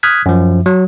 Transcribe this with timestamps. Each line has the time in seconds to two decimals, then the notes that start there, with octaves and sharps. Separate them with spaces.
0.03 D#6 F6 F#6 G#6 B6
0.26 F#2 F3
0.66 F#3